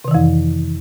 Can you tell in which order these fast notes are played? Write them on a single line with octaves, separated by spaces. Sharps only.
C3 D#3 E3 F2